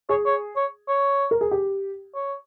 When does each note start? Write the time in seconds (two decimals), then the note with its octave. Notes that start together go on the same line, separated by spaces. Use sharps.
0.09 G#4 C#5
0.26 C#5
0.56 C#5
0.88 C#5
1.31 A#4
1.41 G#4
1.51 G4
2.15 C#5